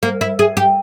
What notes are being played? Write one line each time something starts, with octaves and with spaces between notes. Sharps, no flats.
A#3
E4
G#4
G4